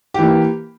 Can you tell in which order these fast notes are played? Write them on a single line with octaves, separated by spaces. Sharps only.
G4 E3 A#3